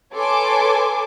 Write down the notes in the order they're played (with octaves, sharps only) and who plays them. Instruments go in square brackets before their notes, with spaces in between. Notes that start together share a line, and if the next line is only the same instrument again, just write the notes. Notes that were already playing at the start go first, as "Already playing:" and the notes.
[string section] A4 B4 C#5 G#5 C6 D6